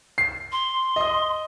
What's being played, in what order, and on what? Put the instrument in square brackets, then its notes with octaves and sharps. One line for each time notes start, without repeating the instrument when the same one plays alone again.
[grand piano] C7
[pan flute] C6
[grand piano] D#5 D#6